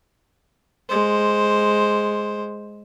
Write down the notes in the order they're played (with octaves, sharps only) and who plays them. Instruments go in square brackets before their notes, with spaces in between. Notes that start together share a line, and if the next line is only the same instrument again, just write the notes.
[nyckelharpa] G#3 C5